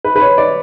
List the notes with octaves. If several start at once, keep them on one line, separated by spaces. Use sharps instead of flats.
B4
B4
C#5
D5